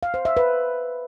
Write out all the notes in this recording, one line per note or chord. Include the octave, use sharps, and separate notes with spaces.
F5
C5
E5
B4